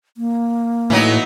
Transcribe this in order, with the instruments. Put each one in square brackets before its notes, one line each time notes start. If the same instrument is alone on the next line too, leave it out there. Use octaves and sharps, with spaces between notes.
[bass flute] A#3
[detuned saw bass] A2 [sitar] E3 F#3 D#4